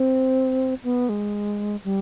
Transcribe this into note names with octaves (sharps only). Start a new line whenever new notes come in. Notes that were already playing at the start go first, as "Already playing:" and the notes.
Already playing: C4
B3
G#3
G3